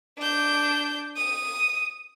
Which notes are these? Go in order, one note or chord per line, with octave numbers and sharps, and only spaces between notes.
D4 G6
D#6